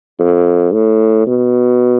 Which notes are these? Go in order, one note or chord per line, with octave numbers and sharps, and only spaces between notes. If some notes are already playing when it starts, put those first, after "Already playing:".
F2
A2
B2